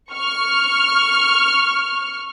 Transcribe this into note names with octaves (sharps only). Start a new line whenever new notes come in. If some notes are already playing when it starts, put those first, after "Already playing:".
C#6 F6